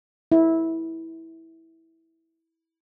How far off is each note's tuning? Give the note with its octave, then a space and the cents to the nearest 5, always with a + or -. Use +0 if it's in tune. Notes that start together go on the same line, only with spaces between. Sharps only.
E4 -15